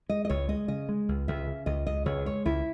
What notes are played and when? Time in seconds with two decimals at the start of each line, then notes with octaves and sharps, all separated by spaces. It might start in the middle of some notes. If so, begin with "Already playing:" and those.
0.09 G#3 D#5
0.25 D#5
0.29 C#2 C#5
0.48 G#3 D#5
0.68 C#3 D#5
0.89 G#3
1.08 C#2
1.28 C#2 E5
1.47 C#3
1.66 C#2 D#5
1.87 C#2 D#5
2.06 C#2 C#5
2.26 G#3 C#5
2.45 C#2 E4